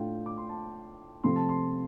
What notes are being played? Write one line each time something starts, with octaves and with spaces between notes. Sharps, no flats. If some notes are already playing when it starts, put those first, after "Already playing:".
Already playing: A2 A3 D4 F4 G5
D6
C6
A5
C3 F3 A3 C4 C6
A5
C6